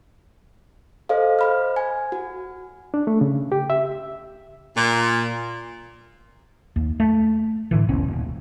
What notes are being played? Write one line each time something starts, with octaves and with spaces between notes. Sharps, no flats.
A4 C5 D#5 F5
C5 B5 F6
G#5
F#4
D4
A3
C#3
G4
E5
A#2
D#2
A3
A2 D3 E3
E1 C2 B3 C#4
D#1